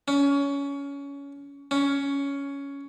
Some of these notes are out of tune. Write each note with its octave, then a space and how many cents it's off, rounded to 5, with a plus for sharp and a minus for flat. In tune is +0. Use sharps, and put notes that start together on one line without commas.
C#4 +20
C#4 +10